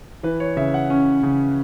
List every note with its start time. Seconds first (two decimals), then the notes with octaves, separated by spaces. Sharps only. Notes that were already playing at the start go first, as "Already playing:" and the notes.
0.23 E3 B4
0.40 C#5
0.57 C#3 E5
0.74 F#5
0.90 C#4
1.23 C#3